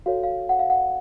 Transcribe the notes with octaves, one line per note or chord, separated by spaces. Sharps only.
F#4 A4 C#5 F5
F5
F#5
F5
F#5